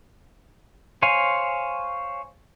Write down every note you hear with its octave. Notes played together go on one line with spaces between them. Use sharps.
C5 C#5 F5 G#5